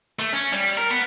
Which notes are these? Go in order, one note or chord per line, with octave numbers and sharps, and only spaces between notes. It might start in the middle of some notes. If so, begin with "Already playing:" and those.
A3
C#4
G3
A#4
B3